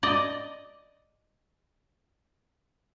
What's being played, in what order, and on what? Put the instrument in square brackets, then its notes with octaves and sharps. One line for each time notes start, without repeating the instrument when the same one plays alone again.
[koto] D5 D#5